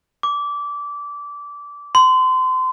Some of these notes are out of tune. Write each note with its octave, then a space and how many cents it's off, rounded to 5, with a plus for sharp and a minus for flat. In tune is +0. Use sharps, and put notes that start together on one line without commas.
D6 -20
C6 -30